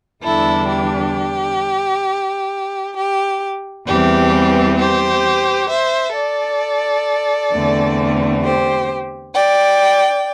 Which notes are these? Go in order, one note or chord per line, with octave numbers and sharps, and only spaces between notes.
E2 D3 G3 D4 E4 A4
G4
G4
E2 E3 G3 C4 G4
G4 C5
C5 E5
A4 D5
E2 D3 A3 C4
G4 C5
D5 G5